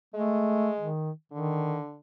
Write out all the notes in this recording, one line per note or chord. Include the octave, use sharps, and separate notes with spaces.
G#3 A3
D#3
D3 D#3